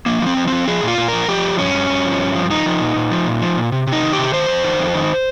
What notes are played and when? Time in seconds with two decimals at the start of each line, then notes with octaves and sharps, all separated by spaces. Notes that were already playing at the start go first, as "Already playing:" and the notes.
0.06 F3 A#3
0.21 F3 C4
0.37 F3
0.47 F3 C4
0.68 F3 G#4
0.83 A#2 F4
0.98 A#2
1.08 F3 A#4
1.28 F3 G4
1.44 G2
1.59 G2 C#4
1.74 G2
1.90 G2
2.05 F3
2.19 G2
2.35 F3
2.50 F3 D#4
2.66 F3
2.81 A#2
2.96 A#2
3.11 F3
3.26 A#2
3.42 F3
3.57 A#2
3.72 C3
3.87 C3
3.93 D#4
4.03 D#3
4.13 G4
4.18 C3
4.33 D#3 C5
4.48 F2
4.64 D#3
4.79 F2
4.94 D#3